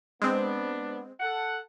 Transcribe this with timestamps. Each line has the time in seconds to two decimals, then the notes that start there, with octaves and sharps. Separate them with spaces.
0.22 G#3 B3 C4 D4
1.20 A4 F#5